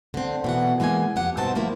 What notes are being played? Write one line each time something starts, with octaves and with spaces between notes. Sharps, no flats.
D3 C4
B2 E3 F#5
E3 G#3 A#3 G5 G#5
F2 G4 F#5
G2 B2 C4 D#4 C5 A5
F3 A3 A#3 E4